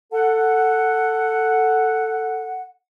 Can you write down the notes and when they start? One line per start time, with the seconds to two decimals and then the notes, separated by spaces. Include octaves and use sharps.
0.12 A4 F#5